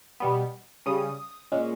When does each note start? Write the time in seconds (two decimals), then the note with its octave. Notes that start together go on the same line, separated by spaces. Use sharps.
0.20 B2 G3 B3
0.86 C#3 G3 C#4 D#6
1.52 A#2 G#3 C#4